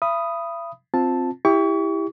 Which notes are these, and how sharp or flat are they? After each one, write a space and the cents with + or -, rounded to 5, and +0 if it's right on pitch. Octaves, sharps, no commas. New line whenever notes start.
E5 +40 B5 +0 D#6 +0
C4 +0 F4 +10 A5 +0
E4 +0 G4 +20 C#6 +35